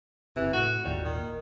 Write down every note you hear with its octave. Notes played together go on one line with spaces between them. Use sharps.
F#1 C3 E3
A2 F#4
G#1 D#2 A#2 G3
D#3